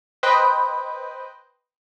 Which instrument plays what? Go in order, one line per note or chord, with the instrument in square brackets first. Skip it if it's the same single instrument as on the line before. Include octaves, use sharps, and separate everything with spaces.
[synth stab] B4 C5 D#5 G5